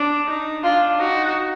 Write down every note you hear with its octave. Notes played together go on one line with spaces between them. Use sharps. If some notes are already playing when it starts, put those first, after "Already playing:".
Already playing: D4
D#4
D4 F4
D#4 F#4